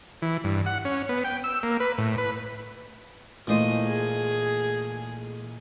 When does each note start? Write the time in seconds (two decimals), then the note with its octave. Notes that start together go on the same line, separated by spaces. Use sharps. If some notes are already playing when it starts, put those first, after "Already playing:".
0.22 E3
0.44 G2
0.66 F#5
0.85 C#4
1.09 B3
1.24 G5
1.44 E6
1.63 A#3
1.80 B4
1.98 A2
2.18 B4
3.47 A#2 E3 A3 D#4 C5 D#5
3.86 G#4